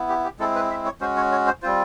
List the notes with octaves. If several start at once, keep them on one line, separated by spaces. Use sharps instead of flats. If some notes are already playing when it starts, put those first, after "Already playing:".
Already playing: B3 E4
G4
G4
G#3 C4 E4 A4
B4
E5
C#5
G#3 C#4 F#4 C5
C#5
C#5
C5
G3 C4 F4 C5